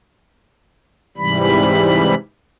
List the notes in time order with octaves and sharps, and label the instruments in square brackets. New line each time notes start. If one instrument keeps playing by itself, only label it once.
[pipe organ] G#2 C3 E3 G3 B5